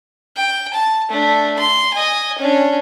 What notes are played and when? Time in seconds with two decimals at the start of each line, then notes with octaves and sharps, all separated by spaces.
0.37 G5
0.73 A5
1.10 A3 D4
1.59 C6
1.93 D#5 G#5
2.38 C#4 D4